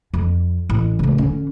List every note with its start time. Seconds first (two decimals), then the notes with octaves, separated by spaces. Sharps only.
0.14 F2
0.70 A1
0.99 C#3 A3
1.18 D3 C#4